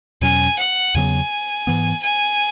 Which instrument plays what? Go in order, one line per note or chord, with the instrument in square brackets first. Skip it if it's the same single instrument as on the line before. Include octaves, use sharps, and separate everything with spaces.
[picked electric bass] E2 B2 F#3 C#4 [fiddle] G#5
[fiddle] F#5
[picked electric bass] E2 C#3 F#3 B3 [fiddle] G#5
[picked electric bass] G#2 E3 B3
[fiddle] G#5